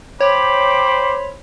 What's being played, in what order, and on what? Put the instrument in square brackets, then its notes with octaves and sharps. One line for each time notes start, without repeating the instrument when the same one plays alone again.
[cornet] C5 [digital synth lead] C#5 [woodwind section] G5 D6 [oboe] B5